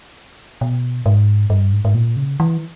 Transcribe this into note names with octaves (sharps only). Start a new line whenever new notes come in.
B2
G#2
G2
G#2
G#2
A#2
C#3
E3